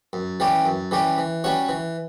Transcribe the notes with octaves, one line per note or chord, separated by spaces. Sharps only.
F#2
E3 G3 C#4 G4
F#2
E3 G3 C#4 G4
E3
G3 C#4 F#4 C#5
E3